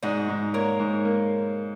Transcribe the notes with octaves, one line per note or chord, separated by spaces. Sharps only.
G#2 D#4 F#4
G#2
A#3 A#4 C#5
G#2
A#3